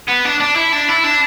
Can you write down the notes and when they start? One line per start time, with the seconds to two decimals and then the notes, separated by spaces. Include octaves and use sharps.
0.08 B3
0.25 D4
0.40 D4
0.56 E4
0.72 D4
0.88 E4
1.04 D4